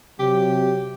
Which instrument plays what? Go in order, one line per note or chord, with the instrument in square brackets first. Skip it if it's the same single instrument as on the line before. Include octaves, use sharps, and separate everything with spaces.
[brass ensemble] C3 F#3 [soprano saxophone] G4